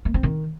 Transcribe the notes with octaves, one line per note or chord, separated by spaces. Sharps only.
A#3
C4
D#3